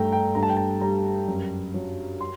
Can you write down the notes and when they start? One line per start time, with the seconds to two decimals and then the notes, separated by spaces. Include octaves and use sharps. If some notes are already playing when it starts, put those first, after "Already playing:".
Already playing: G2 A3 G5 A#5
0.12 G5
0.35 G2 A#5
0.43 A5
0.50 G5
0.57 A5
0.81 G3 A#5
1.28 F#2
1.74 F#3
2.21 C6